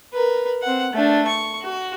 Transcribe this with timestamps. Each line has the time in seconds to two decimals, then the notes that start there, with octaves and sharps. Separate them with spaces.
0.13 A#4 B4
0.62 C4 F#5
0.93 A3 D4
1.27 C#6
1.61 F#4